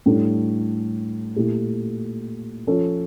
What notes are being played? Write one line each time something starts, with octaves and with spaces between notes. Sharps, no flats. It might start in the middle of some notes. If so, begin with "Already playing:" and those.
A2 G3 D4 A4
A#2 A3 E4 G4
F3 C#4 F4 A4